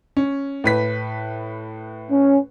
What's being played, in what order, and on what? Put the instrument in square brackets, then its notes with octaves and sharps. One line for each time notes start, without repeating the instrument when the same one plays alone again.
[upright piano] C#4
A2 B4 B6
[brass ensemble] C#4